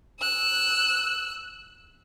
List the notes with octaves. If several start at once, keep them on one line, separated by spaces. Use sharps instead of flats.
E6 F#6